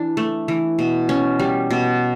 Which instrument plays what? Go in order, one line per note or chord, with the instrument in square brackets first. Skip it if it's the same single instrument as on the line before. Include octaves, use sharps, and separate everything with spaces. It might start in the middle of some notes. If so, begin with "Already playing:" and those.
Already playing: [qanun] E3 D4
A3
E3
B2
C#4
G3
B2